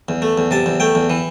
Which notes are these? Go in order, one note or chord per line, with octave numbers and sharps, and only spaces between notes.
E2
A3
E2
C3 A5
E2
A3 G5
E2
E3